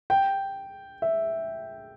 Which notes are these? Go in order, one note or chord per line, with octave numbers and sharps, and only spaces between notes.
G5
E5